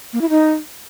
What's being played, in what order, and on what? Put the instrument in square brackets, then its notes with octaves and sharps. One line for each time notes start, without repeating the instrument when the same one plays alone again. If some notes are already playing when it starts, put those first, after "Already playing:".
[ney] A#3
E4
D#4